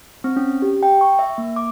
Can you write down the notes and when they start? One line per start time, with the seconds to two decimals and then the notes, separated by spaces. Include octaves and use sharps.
0.24 C4
0.36 C#4
0.62 G4
0.83 G5
1.01 C#6
1.19 E5
1.38 A#3
1.56 D6